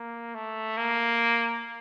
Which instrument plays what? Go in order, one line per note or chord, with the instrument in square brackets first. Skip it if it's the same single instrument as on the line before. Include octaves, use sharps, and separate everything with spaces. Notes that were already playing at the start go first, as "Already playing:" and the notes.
Already playing: [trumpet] A#3
A3
A#3